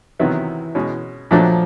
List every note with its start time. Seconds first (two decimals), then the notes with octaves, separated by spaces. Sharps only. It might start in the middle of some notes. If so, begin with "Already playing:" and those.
0.19 C3 D#3 E3 F#3 B3 E4
0.75 B2 G#3 C#4
1.31 A#2 F3 F#3 A3 D4